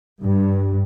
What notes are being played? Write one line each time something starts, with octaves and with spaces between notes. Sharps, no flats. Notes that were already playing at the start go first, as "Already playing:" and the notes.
G2